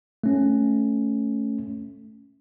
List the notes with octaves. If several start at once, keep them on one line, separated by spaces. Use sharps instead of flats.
A3 C#4